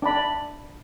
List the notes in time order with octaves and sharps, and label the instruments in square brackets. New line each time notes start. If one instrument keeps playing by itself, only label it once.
[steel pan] D4 D5 B5